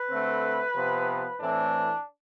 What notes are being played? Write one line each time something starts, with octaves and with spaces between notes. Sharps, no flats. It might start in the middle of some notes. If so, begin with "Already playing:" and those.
Already playing: B4
D3 A3 C4
C3 F3 B3
A2 E3 A3 C4 D4